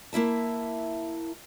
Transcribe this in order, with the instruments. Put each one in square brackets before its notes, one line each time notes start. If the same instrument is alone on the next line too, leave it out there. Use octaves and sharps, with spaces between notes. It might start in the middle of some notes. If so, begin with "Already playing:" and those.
[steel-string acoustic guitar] A#3 E4 E5 A5